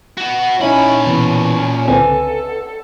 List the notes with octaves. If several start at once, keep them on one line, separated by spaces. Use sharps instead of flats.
B3 F#4
A#2 C#4 D#4 E4 B5
B2 E3 C#4
C#2 D3 C4 A4 B4 G#5